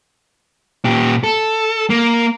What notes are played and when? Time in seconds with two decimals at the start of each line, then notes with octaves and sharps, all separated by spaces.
0.85 A#2 G4
1.24 A4
1.90 A#3